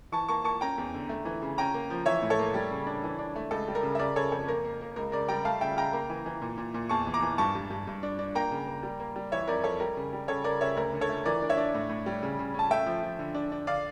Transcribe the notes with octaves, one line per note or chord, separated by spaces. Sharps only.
E3 A5 C#6
A#3 A5 C#6
A#3 A5 C#6
C#4 G5 A#5
E2
D3
A3
E3
C#3
C#4 G5 A#5
A#3
F3
E3 C#5 E5
A2
A4 C#5
A#3
G3
C#3
D4
E3
D4
A3
C#2 A4
G3
A#4
C#3
E5
C#3 A#4 D5
C#3 A4 C#5
F2 A4
A#3 A#4
A#3
A#3
C#2 A#4
C#3 A#4 D5
G3 G5 A#5
A3 F5 A5
C#3 E5 G5
C#3 G5 A#5
A#3
E3
E3
A#2
A#2
A#2
E2 A5 C#6
E3
A#5 D6
E3
G2 A5 C#6
G2
G2
G2
D4
D4
A#3 G5 A#5
C#3
A#3
G3
A#3
G3
E3 C#5 E5
F2 A#4 D5
F2 A4 C#5
G3 A#4
C#3
G3
C#3 A4 C#5
C#3 A#4 D5
C#3 C#5 E5
D2 A#4
D3
A4 C#5
A3
E3 A#4 D5
D4
C#5 E5
D4
A2
A2
G3
C#3
C#3
C#4 A5
A3 E5 G5
F3
F3
D3
D4
D4
D3 D5 F5